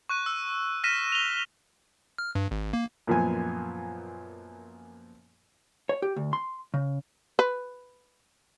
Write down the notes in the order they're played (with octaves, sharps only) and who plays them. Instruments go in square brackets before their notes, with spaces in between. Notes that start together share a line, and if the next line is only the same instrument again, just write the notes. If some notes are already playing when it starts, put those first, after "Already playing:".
[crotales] C#6 F#6 D#7
E6
F6 A#6 B6 D#7 E7
F7 G7
[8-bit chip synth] F6
G2
G#1
A#3
[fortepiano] F#2 A#2 F3 B3 G#5
[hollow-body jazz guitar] C#5
G4
D2
C6
C#3
[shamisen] B4